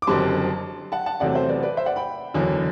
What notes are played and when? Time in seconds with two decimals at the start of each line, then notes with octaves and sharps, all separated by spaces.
0.02 D6
0.07 F#1 F#2 D3 G3 C4 A5 C6
0.92 F#5 A5
1.06 F#5 A5
1.20 E2 C3 F#3 A3 C4 D5 F#5
1.35 C5 E5
1.49 B4 D5
1.63 B4 D5
1.77 C5 E5
1.86 D5 F#5
1.96 G5 B5
2.34 F#1 E2 D3 F#3